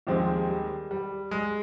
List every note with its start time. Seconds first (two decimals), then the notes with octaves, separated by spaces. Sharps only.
0.07 D#2 D#3 F3 G#3 C4 G4
0.49 G3
0.91 G3
1.31 G#3